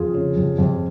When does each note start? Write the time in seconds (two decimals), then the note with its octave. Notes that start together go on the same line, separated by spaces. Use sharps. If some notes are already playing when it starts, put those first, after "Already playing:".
Already playing: F2 F4 G#4
0.14 C#3
0.36 F2
0.59 F2